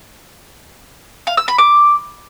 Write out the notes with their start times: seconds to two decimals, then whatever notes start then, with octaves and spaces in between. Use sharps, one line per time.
1.27 F5
1.37 E6
1.48 B5
1.58 D6